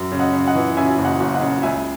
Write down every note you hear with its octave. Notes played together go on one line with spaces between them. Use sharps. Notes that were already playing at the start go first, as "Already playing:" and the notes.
Already playing: F#2
C#3
D#5 F#5
C#3
D#5 F#5
E3
C#3 E5 G#5
F#1
D#5 F#5
F#1
D#5 F#5
C#3
C#2 E5 G#5